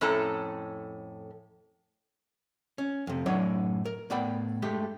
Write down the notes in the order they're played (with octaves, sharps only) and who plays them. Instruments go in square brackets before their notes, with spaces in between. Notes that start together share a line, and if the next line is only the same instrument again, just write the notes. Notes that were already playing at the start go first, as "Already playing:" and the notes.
[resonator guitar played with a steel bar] F2 A2 C#4 A4 A#5
[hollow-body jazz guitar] C#4
F2 C3
F#2 A2 F#3 D#4 C#5 D5
A#4
A2 B3 D5 G5 B5
G2 G#3 A3 G4